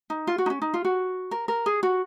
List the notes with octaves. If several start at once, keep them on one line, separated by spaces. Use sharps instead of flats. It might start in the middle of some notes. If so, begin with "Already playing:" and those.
D#4
F4
F#4
D#4
C#4
D#4
F4
F#4
A#4
A#4
G#4
F#4